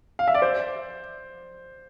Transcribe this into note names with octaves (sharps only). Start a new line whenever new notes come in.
F5
E5
D5
C5